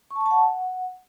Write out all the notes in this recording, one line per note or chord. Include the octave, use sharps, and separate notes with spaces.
C#6
A5
C#6
A5
F#5